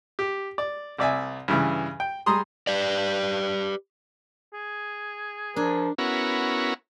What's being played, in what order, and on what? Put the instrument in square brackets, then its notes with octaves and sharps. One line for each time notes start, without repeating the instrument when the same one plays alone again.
[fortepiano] G4
D5
C2 D5 E5 G#5
G2 C#3 E3
G5
G3 G#4 A#5 C6 D#6
[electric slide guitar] G4 B4 D5
[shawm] G#4
[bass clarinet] F3 [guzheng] D4 [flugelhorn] A#4
[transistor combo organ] B3 C#4 E4 F#4 A#4